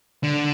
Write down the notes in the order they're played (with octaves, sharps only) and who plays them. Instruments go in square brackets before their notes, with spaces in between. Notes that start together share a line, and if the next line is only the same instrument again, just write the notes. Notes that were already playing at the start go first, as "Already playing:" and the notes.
[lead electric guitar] D3